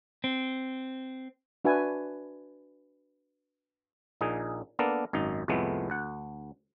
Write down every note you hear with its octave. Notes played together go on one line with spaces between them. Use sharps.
C4
D4 F#4 B4 E5 G#5
A#1 A#2 D#4 G#4
A#3 B3 D4 A4 A#4
G#1 F#2 D#4
C2 F2 A2 G#3 A3 B3
D2 F#5